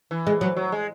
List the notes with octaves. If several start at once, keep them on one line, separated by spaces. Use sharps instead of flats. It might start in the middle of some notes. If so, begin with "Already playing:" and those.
E3
G#3
F#3
F#3
G#3